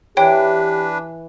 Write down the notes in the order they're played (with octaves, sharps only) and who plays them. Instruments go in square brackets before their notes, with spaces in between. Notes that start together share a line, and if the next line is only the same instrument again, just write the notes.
[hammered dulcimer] E3 [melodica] D4 B4 [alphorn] G4 [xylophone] C#5 G5